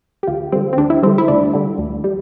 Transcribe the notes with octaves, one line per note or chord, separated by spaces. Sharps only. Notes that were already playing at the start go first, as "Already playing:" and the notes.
G4
D2 F4
D3 G3 C4
C4
D2 D4
E4
D3 G3 C4
E4
D2 D4
D3 G3
D2
G3